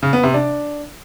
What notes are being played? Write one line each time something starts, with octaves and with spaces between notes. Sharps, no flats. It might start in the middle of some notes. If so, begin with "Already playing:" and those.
C#3
B3
C3
D4